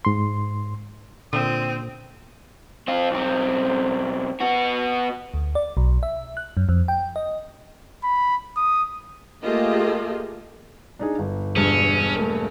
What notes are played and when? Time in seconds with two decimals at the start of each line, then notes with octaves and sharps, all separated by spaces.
0.05 G#2 C6
1.33 A#2 D3 C4 D#6
2.88 C4 F4
3.11 B1 C4
4.41 B3 F#4
5.34 D2
5.55 D5
5.77 B1
6.03 E5
6.37 F#6
6.57 F#2
6.69 F2
6.88 G5
7.16 D#5
8.04 B5
8.57 D#6
9.43 A3 A#3 F4 G4 G#4 D#5
10.99 D4 D#4 G#4
11.19 G1
11.56 E1 G2 C#4
12.16 A3 A#3